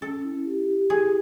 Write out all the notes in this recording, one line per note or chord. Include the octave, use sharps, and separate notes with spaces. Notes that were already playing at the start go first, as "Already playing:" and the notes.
C#4 A4
E4
G4
G4
E4 G#4